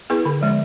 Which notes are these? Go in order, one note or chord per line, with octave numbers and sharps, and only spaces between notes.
B3 E4 G#4 B4
D3
F3 G#3